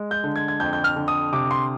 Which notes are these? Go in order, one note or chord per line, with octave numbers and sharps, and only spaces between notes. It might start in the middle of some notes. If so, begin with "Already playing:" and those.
Already playing: G#3
G6
D3
G#6
G#6
F2 G6
G6
F6
D3
D#6
C3 D6
C6